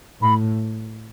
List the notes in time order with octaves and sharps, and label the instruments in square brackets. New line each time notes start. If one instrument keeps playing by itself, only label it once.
[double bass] A2 [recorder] B5